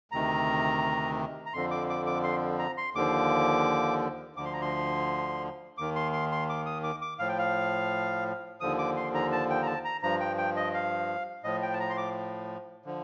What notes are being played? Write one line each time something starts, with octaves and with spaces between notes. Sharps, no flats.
D2 C3 D#3 A#5
A#5
F2 D3 F3 C6
D6
D6
D6
C6
A#5
C6
D#2 D3 F3 D6
D2 D3 F3 D6
C6
A#5
C6
D#2 D#3 D6
C6
C6
C6
D6
D#6
D6
D6
A2 F3 F5
G5
F5
D#2 D3 F3 D#6
D6
C6
A#5
A5
G5
A#5
A5
A#5
G2 F3 A#5
G5
G5
D#5
F5
A2 F3 D#5
G5
A5
A#5
C6
D6
D3 F3